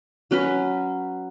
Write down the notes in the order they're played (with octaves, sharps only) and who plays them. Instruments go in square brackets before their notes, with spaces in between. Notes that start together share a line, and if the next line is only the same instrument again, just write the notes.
[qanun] F#3 C#4 F#4 B4